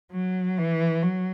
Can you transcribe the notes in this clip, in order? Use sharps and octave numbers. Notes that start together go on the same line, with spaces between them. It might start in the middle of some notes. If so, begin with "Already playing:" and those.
F#3
E3
F#3